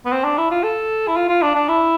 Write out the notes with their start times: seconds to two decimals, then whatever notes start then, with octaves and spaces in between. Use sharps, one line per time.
0.05 B3
0.12 C4
0.24 D4
0.38 E4
0.51 F4
0.63 A4
1.08 E4
1.16 F4
1.28 F4
1.42 D4
1.55 D4
1.68 E4